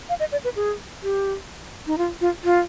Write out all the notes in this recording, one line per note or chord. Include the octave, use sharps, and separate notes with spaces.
F5
D#5
D5
B4
G#4
G4
D#4
F4
F4
F4